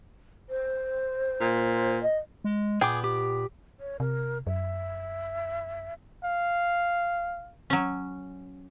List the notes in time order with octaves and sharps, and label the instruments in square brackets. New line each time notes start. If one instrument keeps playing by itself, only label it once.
[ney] C5
[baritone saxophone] A#2
[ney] D#5
[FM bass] G#3
[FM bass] A#2 [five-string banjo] B3 G5 [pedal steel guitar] G#4 D6
[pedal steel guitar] G4 D6
[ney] C#5
[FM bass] C3 [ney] A#4
[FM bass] F#2 [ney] E5
[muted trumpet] F5
[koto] F#3 C#4